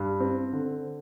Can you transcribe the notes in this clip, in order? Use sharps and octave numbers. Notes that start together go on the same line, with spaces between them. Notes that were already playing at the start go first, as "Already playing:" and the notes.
Already playing: G2
C4
D3